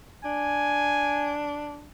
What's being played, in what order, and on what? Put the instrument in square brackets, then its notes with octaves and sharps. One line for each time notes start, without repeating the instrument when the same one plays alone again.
[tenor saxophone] D4 [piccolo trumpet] G#5